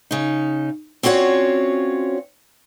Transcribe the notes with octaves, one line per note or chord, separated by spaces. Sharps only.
C#3 D#4
C4 C#4 F4 F#4 C#5 D5